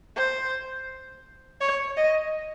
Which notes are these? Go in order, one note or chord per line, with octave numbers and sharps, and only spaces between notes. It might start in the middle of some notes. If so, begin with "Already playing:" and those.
C5
C#5
D#5